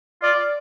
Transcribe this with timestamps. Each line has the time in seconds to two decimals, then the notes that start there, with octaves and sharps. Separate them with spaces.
0.23 F4 D5